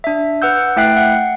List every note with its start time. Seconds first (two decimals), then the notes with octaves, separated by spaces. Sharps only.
0.04 D4 E5
0.42 B4 F#5 E6 G6
0.76 A3 E4 E5 G5 F#6 C7
0.96 F#5